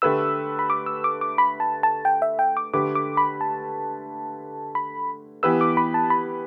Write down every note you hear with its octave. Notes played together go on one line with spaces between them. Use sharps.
D3 A3 G4 B4 E6
B5
D6
E6
D6
D6
B5
A5
A5
G5
E5
G5
D6
D3 A3 G4 B4 D6
D6
B5
A5
B5
E3 B3 G4 B4 E6
D6
B5
A5
B5